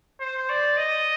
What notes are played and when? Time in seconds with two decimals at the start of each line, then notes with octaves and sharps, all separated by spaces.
0.20 C5
0.49 D5
0.77 D#5